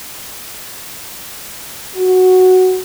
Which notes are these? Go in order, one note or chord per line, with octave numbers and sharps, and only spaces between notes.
F#4